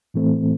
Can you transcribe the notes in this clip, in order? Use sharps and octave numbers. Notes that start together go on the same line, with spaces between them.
A2 E3 A3 C4